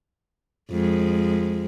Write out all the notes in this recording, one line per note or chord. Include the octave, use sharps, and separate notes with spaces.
F2 G#3